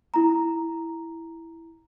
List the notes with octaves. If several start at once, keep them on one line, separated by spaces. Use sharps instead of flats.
E4 A#5